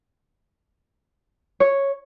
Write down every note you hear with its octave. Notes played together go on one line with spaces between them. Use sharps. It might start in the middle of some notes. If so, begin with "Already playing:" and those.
C#5